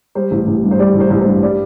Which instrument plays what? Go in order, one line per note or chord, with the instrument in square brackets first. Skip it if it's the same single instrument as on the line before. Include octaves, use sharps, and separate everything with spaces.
[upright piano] G3 C5
A1
A1
G2
C5
G3 D5
A1
C5
A1
C5
G2
G3 D5